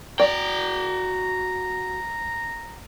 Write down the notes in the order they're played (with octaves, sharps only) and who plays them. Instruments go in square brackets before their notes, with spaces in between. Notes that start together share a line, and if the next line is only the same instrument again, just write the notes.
[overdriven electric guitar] F#4 G5 [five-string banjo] D5 [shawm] A#5